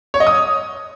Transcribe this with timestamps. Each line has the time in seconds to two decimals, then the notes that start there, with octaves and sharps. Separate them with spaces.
0.14 C#5
0.20 D#5
0.27 D#6